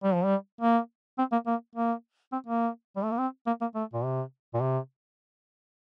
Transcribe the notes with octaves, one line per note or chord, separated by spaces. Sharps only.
G3
F3
G3
A#3
C4
A#3
A#3
A#3
C4
A#3
G3
A3
A#3
C4
A#3
A#3
A3
A#2
C3
A#2
C3